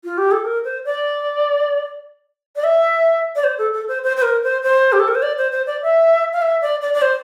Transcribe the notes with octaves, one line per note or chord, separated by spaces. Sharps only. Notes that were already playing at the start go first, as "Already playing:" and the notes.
F4
G4
A4
A#4
C5
D5
D5
E5
D5
C5
A4
A4
C5
C5
C5
A#4
C5
C5
G4
A4
A#4
C5
D5
C5
C5
D5
E5
F5
E5
D5
D5
D5
C5